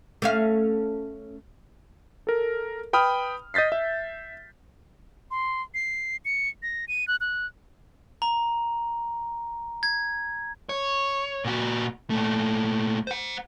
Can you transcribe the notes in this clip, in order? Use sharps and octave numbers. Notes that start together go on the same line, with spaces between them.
A3 C#4 F5
A4 A#4
B4 G5 B5 D#6 F6
D#5 G6 A6 B6 C7
E5
C6
C7
C#7
A#6
D#7
F#6
F#6
A#5
G#6
C#5
A#2 F#4
A#2 A3
C5 F#5